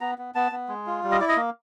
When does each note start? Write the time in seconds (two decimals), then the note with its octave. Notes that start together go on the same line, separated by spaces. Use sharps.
0.01 B3 A#5
0.18 B3
0.35 B3 A5
0.52 B3
0.68 G#3
0.87 F4
1.04 G3
1.12 D#5
1.20 E4 D5
1.28 D#5
1.37 A#3